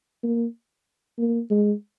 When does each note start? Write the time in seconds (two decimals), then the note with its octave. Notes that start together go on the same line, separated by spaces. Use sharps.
0.23 A#3
1.18 A#3
1.50 G#3